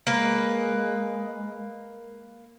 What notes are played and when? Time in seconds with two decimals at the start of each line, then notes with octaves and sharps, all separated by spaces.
0.07 G#3 A#3 B4